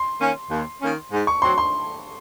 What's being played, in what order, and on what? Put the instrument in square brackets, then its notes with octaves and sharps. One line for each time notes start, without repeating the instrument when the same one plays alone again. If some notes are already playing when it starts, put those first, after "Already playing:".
Already playing: [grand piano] C6
[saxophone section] D#3 A#3 C#4
D#2
D#3 A#3 C#4
G#2
[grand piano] C#6
[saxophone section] F#3 C4 [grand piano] C6
[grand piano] C6